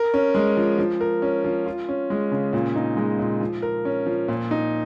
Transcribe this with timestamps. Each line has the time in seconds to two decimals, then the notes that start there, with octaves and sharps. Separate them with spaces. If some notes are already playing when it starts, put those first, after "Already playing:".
Already playing: A#4
0.14 C#4
0.35 G#3
0.57 F3
0.78 F3
1.01 A#4
1.22 C#4
1.44 F3
1.66 F4
1.89 C#4
2.10 G#3
2.32 C#3
2.53 A#2
2.75 D#4
2.97 G#3
3.19 A#2
3.41 F3
3.62 A#4
3.85 C#4
4.06 F3
4.28 A#2
4.51 D#4